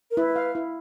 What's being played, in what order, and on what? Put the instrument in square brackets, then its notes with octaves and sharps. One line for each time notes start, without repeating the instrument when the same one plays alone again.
[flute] A#4
[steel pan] E4 [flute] B4
[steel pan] F5
E4